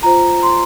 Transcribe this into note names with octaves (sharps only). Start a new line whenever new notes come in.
F4 C5 A#5
C6